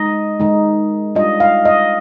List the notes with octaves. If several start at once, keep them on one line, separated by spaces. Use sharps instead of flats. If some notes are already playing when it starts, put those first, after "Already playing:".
Already playing: G#3 D#4 D#5
D#3 G#3 D#4
G3 D4 F4 D#5
F5
D#5